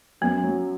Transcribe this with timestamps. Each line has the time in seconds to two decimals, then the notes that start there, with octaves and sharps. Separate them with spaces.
0.21 F#2 B3
0.44 F#3